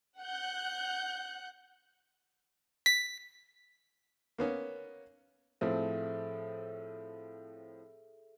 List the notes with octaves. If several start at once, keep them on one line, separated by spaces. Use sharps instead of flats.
F#5 F#6 G6
B6
A#3 B3 C#4
A2 F3 C4 G#4 A4 E5